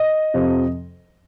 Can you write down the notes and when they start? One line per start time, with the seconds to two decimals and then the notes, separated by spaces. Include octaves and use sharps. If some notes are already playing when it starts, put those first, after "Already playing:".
Already playing: D#5
0.34 F2 C3 F3